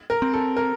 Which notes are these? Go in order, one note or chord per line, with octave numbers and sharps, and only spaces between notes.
A#4
C4
A4
A#4